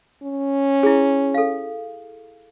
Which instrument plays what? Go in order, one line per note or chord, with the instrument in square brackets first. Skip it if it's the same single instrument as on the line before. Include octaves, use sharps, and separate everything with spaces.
[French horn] C#4
[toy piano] E4 G#4
A4 F5